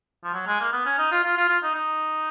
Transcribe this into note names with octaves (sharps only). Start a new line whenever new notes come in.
F3
F#3
G#3
A#3
B3
C#4
D#4
F4
F4
F4
F4
D#4
D#4